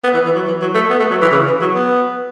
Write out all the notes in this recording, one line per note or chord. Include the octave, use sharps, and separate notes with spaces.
B3
E3
E3
F#3
E3
F#3
A3
B3
A3
F#3
E3
C#3
E3
F#3
B3